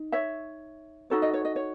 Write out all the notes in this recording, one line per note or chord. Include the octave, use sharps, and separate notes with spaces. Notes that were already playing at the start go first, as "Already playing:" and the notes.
Already playing: D#4
C#5 E5
D#4 F#4 A4 C#5
D#5
C#5
D#5
C#5